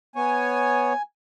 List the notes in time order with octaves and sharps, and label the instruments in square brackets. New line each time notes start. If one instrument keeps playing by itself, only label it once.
[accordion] B3 C#5 [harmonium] G#5